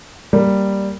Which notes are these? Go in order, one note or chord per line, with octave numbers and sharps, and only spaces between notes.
G3 A#3